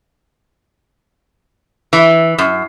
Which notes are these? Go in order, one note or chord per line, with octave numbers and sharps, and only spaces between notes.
E3
F#2